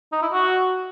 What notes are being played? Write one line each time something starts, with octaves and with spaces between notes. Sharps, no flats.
D#4
E4
F#4